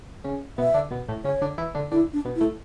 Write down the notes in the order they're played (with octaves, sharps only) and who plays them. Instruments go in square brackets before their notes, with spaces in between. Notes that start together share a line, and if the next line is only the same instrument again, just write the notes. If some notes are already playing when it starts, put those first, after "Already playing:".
[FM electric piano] C#3 C#4
[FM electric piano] B2 B3 [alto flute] E5
[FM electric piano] D3 D4
B2 B3
A2 A3
[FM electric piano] C#3 C#4 [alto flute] C#5
[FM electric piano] D3 D4
E3 E4
D3 D4
[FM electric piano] D3 D4 [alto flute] E4
[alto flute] D4
[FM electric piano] B2 B3
[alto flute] E4
[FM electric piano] A2 A3